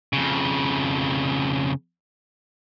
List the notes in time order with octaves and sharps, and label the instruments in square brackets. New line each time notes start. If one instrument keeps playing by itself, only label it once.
[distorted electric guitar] F2 C#3